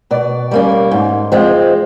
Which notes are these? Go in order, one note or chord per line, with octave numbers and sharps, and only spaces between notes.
B2 D5
G3 A#3 C#4
G#2
F3 G#3 C4